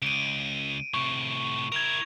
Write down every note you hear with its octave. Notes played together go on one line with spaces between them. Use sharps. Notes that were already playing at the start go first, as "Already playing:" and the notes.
C#2 D7 D#7
A2 C3 C#6
E4 A#4 G#6 F7